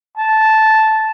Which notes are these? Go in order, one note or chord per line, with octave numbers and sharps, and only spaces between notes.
A5